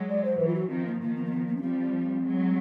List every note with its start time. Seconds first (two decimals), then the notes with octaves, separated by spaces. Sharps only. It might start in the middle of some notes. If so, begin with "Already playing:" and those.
Already playing: F#3 G#3
0.09 D5
0.25 C5
0.40 E3 F#3 B4
0.47 F4
0.55 F#4
0.70 D#3 F3 C4
0.86 A#3
1.01 D#3 F3 A#3
1.16 B3
1.25 A#3
1.31 B3
1.47 A#3
1.57 C#4
1.62 F3 G3 C4
2.24 F#3 G#3